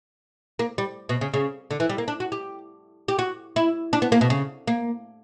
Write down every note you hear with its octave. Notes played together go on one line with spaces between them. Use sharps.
A#3
G3
B2
C#3
C#3
D3
E3
G3
A#3
D4
F#4
G4
G4
F#4
E4
D4
B3
A#3
B2
C#3
A#3